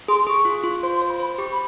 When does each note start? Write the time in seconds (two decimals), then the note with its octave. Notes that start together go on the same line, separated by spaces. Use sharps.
0.08 G#4 C6
0.27 G#4 C#6
0.45 F4
0.64 F4
0.82 C5 C6
0.95 C6
1.02 C5
1.08 B5
1.19 C5 B5
1.38 G4 C#6
1.52 B5